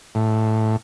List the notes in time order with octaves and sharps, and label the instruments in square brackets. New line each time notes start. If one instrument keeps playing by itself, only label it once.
[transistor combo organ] A2